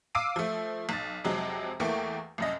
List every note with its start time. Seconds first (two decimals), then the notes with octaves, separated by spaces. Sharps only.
0.15 F5 D6 E6 C7 D7 D#7
0.36 F3 A3
0.89 B1 A6
1.24 F2 C3 F#3 G#3 C4
1.80 E2 E3 A3 A#3 G5 C#6
2.38 C2 F#2 D#5